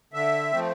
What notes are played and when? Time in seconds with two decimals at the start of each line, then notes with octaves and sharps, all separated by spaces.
0.13 D3 E5
0.52 F3 A3 C4